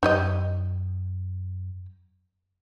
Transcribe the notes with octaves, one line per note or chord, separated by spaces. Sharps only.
F#2 D#4 G4 D#5